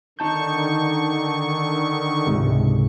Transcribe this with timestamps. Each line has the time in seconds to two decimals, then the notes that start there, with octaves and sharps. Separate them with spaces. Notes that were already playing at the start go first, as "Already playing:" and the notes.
0.19 D3 D#3 D#4 A5 C#6 G6
2.27 C#2 G#2 C3